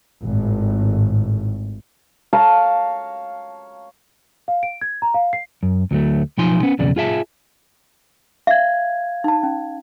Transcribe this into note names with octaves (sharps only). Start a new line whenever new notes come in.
G#1 A2
C#5 F5 A5 A#5
F5
D7
G#6
A#5
F5
C7
F#2
D2 F#3 A3
B1 F3 D#4 G#5 C6
B3 C#4
B1 E2 C#3 D5
F4 G#4 E5 A5
E5 F5 G#6
D#4 A5
C#4